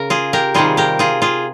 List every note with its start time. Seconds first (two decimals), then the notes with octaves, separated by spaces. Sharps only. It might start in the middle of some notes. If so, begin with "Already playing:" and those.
Already playing: C#3 A#4
0.10 F4 G#4
0.33 G4 A#4
0.54 C3 D#3 G3 F4 G#4
0.77 G4 A#4
0.99 F4 G#4
1.22 F4 G#4